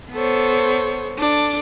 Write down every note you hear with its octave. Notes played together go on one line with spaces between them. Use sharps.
B3 A4 C5 C#5
D4 A4 D6